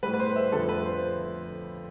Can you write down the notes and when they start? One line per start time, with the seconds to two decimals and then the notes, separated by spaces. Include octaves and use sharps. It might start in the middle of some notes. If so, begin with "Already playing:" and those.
0.03 A2 G3 B4
0.14 B4
0.20 C5
0.36 E5
0.52 F2 D3 F3 A3 A4
0.69 B4
0.85 C5